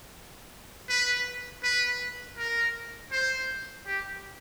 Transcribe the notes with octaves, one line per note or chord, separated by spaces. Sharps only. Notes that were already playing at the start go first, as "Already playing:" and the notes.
B4
B4
A#4
C5
G4